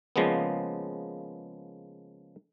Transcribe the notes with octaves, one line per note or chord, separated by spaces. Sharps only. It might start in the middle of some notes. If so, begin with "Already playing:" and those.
C#3 F3 G#3 A#3 B3